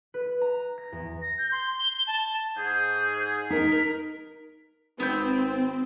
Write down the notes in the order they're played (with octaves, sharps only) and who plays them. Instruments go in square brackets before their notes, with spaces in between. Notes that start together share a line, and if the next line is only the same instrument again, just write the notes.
[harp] B4
A#5
A#6
E2
[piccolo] A#6
G6
C6
G7
A5
[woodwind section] G#2 G#4 [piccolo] G6
[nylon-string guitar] D#4 [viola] A#4 [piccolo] B6
[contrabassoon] G#1 [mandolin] B3 G6 [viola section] C4